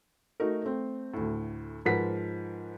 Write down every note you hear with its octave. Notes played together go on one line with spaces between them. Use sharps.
A3 D#4 F#4 A#4
A3 C4
D2 A2
G#2 F3 A#4 B4 F#5 B6